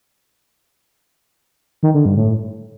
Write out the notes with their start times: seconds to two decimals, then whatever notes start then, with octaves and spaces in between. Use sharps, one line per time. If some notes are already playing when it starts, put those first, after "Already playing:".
1.83 D#3
1.94 D3
2.05 G2
2.17 A2